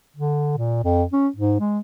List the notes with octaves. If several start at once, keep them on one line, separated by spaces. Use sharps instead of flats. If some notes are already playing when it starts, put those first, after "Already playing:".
D3
A#2
F2
C#4
G#2
G#3